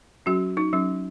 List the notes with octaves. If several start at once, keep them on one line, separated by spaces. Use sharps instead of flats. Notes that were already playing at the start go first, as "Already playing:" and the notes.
F#3 C#4 F#4
D#4
F#3 C#4